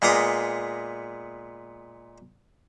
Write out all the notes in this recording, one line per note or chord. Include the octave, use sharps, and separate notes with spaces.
A#2 G#3 B3 A#5 D6 D#6